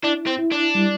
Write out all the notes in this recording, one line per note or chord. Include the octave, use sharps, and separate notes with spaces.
D4 E4
C4
E4
D4
G3